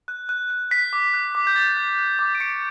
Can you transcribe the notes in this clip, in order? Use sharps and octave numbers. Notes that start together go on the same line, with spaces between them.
F#6
F#6
F#6
F#6 B6
D6
F#6
D6
G6
D6 A6
F#6
F#6
D6
D7
C#6 C#7